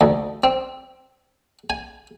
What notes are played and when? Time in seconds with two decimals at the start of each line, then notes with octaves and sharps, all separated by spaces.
0.01 D2
0.44 C4
1.70 G#5